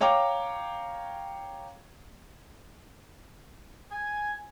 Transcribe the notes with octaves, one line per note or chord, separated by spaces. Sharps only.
C#5 F5 G5 A#5 D6
G#5